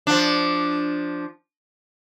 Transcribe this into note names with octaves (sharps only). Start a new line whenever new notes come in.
F3 D4